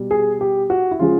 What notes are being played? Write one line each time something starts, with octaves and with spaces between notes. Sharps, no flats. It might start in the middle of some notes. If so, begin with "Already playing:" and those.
Already playing: B2 G3
G#4
G4
F#4
E4
C#3 F3 G#3 F4